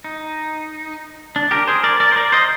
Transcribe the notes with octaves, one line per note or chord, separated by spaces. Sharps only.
D#4
D4
G4 A#4
G#4 C5
A#4 D5
A#4 D5
C5
A#4 D5
C5 D#5